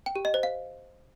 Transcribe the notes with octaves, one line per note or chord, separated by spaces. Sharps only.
G5
G4
D#5
C5
F5